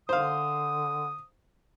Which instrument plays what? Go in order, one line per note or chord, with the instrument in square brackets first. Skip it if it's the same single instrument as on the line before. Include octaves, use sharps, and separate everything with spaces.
[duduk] D3 [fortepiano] C5 F5 [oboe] D#6